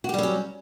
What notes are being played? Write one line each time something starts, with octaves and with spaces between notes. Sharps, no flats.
F#3 G3 C#4 F#4 G4